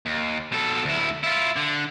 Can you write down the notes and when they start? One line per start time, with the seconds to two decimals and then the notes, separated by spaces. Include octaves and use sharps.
0.06 D#2
0.52 B2 A4
0.85 D2 E4
1.24 E4 F4
1.57 D3